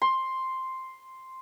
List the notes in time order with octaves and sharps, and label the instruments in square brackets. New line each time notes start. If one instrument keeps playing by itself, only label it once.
[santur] C6